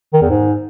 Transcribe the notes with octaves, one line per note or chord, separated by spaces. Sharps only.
D#3
E2
G#2